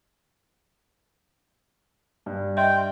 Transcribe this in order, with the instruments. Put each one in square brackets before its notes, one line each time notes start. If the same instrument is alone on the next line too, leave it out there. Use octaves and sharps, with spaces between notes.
[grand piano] G2
[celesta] D#5 E5 C6 [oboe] G5